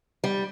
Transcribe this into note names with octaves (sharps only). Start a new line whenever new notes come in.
G3